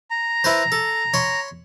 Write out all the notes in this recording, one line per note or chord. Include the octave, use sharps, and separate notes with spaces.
A#5
E4 B4 C5
A4
C#5 B5 C6